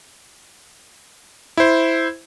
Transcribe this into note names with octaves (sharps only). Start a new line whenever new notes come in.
E4 C5